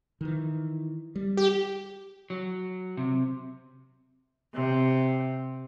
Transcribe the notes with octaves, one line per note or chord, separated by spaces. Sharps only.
D#3 E3
G3
G4
F#3
C3
C3